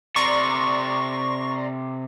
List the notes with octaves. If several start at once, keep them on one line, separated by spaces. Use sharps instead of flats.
C3 A4 D5 A#5 C6 C#6